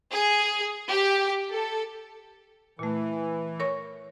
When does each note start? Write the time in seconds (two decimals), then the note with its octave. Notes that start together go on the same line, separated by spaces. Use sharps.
0.12 G#4
0.90 G4
1.52 A4
2.79 A#2 E3 A3
3.60 A#4 C#5 C#6